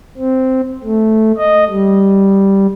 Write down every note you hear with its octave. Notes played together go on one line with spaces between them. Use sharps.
C4
A3
D#5
G3